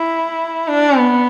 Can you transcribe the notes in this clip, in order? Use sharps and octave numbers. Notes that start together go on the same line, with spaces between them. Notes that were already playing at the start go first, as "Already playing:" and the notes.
Already playing: E4
D4
B3